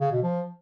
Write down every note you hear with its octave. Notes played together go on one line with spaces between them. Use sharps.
C#3
B2
F3